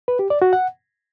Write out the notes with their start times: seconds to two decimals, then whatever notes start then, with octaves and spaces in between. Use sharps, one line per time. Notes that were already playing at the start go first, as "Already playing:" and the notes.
0.08 B4
0.19 G4
0.30 D5
0.42 F#4
0.53 F#5